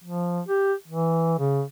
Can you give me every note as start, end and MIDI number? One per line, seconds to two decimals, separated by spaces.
0.04 0.41 53
0.48 0.74 67
0.88 1.38 52
1.39 1.62 49